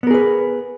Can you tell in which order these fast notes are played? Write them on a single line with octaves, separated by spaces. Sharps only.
B3 A#4 G#4 B4